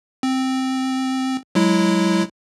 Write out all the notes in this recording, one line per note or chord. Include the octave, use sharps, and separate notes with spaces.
C4
F#3 G#3 E4